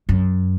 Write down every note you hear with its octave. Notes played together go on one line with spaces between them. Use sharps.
F#2